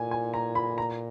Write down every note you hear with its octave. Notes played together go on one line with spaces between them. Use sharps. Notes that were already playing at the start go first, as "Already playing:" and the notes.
Already playing: A#2 G#5
G#5
A#5
B5
A#5